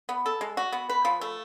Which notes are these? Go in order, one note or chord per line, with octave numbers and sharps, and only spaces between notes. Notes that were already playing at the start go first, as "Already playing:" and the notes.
B3
A4
G#3
F#4
B3
B4
F3
A3